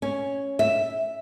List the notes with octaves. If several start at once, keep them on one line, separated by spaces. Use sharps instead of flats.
C#4
E5